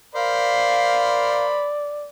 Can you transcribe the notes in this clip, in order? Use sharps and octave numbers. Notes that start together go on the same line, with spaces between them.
A#4 C5 D5 F5 B5